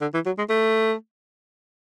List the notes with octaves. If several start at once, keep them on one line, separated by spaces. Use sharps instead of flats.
D3
E3
F#3
G#3
A3